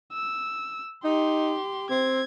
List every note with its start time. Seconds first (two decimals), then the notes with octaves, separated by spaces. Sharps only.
0.13 E6
1.04 D#4 G4 C6
1.90 C4 G#6